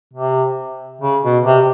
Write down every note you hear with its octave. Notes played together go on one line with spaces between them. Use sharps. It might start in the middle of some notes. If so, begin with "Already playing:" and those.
C3
C#3
B2
C3